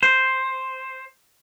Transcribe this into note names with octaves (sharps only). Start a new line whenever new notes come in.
C5